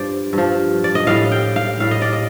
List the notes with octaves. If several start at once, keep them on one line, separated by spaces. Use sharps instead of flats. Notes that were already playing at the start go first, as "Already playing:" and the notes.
Already playing: G2 F3 C5 D5
G2 F3
D5
D#5
A2 G3 F5
G5
F5
A2 G3 F5
D#5
D5
D#5